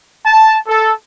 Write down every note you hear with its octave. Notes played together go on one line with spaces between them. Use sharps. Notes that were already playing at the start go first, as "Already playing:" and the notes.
A5
A4